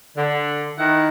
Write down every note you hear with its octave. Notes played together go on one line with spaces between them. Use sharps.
D3
D#3 E4 F#5